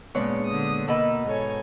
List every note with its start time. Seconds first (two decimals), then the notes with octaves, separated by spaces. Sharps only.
0.15 A#2 C#3 G#3 B3 D4 C#5
0.46 D3 D#6
0.88 B2 A#3 D#4 B4 E6
1.25 G#2 A4 C#5 G#5